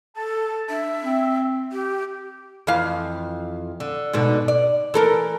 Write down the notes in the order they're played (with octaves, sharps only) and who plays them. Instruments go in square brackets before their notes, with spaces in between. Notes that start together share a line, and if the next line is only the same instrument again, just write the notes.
[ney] A4 [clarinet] A5
[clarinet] D4 [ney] E5
[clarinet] C4
[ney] G4
[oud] F2 E3 F5
D3
G#2 B2 D3
D5
E3 A4 A#4